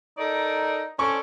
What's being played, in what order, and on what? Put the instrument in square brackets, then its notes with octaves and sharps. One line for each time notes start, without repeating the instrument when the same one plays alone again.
[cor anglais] D#4 [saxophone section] A4 A#4 D5
[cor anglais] C#4 [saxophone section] A4 C5 D5 [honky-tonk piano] C#6